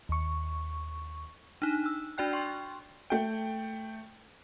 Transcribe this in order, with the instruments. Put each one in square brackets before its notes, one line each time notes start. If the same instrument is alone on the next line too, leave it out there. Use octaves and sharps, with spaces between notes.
[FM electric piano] D#2 C#6
[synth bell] D4 D#4
E6
D4 F#4 D5 G5 F#6
G5 C6 C#6
[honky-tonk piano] A3 G5